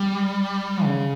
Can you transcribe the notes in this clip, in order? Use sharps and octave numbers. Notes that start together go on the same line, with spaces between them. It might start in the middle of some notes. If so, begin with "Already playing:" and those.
Already playing: G3
C#3